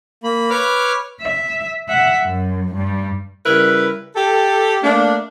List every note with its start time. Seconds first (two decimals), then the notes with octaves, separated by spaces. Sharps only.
0.24 A#3 B5
0.50 B4 C#5 D6 F6
1.22 E5
1.89 E5 F#5
2.23 F#2
2.75 G2 G3
3.46 C#3 G3 E4 A#4 B4
4.16 G4 A4
4.84 A3 A#3 D4